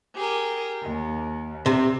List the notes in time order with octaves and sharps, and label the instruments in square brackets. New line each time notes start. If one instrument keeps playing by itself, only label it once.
[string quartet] G4 G#4 A#4
D#2
[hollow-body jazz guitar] C3